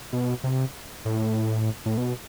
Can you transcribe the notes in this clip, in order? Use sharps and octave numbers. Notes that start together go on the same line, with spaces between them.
B2
C3
A2
A2
B2